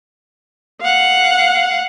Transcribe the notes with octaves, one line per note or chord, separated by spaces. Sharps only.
F5 F#5